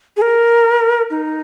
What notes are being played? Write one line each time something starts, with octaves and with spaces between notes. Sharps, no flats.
G#4
A#4
D#4